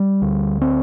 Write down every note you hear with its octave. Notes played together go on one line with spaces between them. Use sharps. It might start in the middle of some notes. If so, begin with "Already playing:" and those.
Already playing: G3
D2
C4